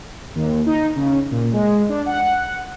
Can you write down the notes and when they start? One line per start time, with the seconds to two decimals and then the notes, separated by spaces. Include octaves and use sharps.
0.35 D#2
0.66 D#4
0.96 C#3
1.31 A#2
1.53 G#3
1.89 D4
2.06 F#5